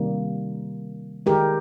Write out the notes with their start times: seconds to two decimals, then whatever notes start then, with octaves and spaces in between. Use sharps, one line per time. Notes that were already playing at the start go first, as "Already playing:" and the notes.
Already playing: C3 D#3 G3 A#3
1.26 D#3 G#3 G4 A#4